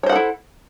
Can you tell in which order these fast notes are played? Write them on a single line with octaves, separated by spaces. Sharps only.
C#5 C5 F#5 A4 E4